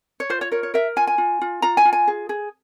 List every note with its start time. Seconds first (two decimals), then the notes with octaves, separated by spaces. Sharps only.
0.20 C#5
0.30 F4 C5
0.41 C#5
0.52 A#4 C#5
0.63 C#5
0.74 A#4 E5
0.96 F4 G#5
1.07 G#5
1.18 F4
1.41 F4
1.62 F4 A#5
1.77 G#5
1.85 F4
1.93 G#5
2.07 G#4
2.29 G#4